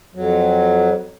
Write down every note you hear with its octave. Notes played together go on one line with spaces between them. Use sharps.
F2 F#3